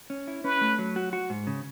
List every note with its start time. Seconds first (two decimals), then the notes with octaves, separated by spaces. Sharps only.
0.10 C#4
0.27 E4
0.44 C#4 B4
0.61 A3
0.79 F#3
0.96 F#4
1.13 F#4
1.30 G#2
1.47 C#3